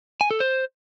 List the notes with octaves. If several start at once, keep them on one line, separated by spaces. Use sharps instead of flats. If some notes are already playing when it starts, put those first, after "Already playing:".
G#5
A4
C5